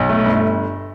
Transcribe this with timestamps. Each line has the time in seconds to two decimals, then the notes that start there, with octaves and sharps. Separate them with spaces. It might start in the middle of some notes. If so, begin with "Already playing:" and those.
Already playing: B1
0.09 A3
0.25 G1